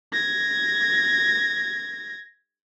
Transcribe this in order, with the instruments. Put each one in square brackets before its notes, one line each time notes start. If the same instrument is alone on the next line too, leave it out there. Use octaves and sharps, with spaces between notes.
[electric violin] G#6 A#6